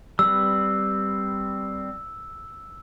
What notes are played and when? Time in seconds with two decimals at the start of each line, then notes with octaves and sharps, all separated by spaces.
0.19 G3 C4 B4 E6